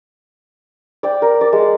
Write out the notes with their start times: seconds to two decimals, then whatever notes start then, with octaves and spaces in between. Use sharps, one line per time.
1.03 D5 G5
1.22 A#4
1.41 D5
1.53 G#3